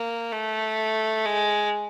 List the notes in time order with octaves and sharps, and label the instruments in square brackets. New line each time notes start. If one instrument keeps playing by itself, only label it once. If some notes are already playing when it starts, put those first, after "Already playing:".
Already playing: [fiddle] A#3
A3
G#3